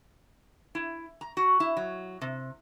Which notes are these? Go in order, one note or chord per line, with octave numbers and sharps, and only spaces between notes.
E4
A#5
F#4
E4
F#3
C3